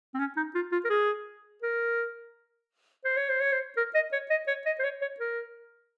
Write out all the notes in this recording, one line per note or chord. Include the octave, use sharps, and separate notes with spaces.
C4
C#4
D#4
F4
F4
A#4
G#4
A#4
C5
C#5
C5
C#5
C5
A#4
D#5
C#5
D#5
C#5
D#5
C5
C#5
C#5
A#4